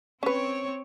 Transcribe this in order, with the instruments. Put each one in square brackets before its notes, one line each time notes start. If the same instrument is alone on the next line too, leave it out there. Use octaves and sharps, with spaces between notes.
[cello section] C4 C#5 [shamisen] C#4 B4